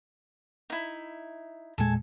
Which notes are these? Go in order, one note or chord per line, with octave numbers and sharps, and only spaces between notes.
D#4 E4
E2 A#2 G#3 A4 G#5